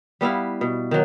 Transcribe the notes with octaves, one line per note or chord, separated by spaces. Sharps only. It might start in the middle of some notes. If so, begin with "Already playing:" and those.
G3 B3 E4 F5
B2
D#3 F#3